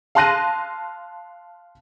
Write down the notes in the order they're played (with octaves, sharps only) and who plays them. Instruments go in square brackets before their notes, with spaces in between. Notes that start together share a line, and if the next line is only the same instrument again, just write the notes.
[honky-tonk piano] F5 A5 C6 F#6 A#6 D#7